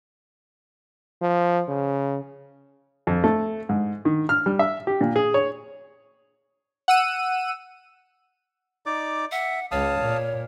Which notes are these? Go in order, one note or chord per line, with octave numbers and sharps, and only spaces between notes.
F3
C#3
F2
A3
G#2
D#3
F6
G3
E5
G4
A#2
G#4
C#5
F#5 E6 D#7
D#4 D5 D6
E5 F#5
C#2 C#5 F5 A5 D#6
A#2